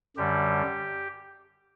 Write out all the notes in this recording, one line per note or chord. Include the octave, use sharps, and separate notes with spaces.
F#2 D3 G3 G4